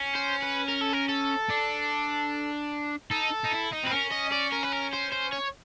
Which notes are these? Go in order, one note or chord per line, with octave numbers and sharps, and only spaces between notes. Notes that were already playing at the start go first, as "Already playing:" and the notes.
Already playing: C#4
C5
B4
A#4
A4
A#4
A4
D4
D#4 A4
D#4
E4
D#4
C4 B4
C#4 A#4
D#5
D5
A#4
B4
A#4
C5
C5
C#5